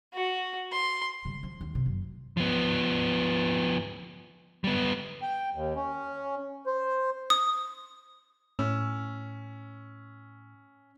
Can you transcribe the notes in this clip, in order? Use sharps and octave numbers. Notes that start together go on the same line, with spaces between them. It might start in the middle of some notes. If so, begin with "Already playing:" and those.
F#4
C6
C#3 G3
F3
D#2
D2 C3
F#1
F3 B3
G3 B3
G5
D#2
C#4
C5
D#6
A2 C#4 E6